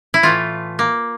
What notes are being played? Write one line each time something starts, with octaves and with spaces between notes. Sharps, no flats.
E4
A2 E3 A3 F4
A#3